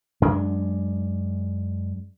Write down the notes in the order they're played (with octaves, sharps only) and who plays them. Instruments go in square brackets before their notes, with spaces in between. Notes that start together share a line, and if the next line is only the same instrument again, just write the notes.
[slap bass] F#2 G#3 D4